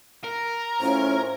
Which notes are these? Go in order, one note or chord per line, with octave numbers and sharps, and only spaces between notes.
A#4
A2 C#4 F4 C5